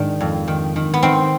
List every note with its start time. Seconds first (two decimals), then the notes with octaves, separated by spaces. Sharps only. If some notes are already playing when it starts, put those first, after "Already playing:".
Already playing: G#2 D#3 D4
0.21 F2
0.48 D#3
0.76 D#3
0.94 B3
1.03 D#3 C4